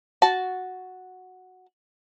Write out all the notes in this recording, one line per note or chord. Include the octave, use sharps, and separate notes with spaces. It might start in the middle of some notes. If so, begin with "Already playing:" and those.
F#4 A5